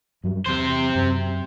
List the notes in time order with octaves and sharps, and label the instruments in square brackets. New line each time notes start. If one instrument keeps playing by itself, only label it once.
[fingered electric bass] G2 F#3 G3
[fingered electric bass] E2 [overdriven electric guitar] C3 C5
[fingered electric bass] F#2